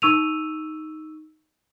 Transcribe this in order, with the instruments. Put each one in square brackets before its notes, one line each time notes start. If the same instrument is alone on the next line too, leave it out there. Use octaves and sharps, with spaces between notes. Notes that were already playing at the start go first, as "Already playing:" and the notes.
[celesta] D#4 C#6 E6 D#7 F7